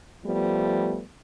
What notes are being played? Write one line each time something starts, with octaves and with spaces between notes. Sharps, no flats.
F3 G3 A3 B3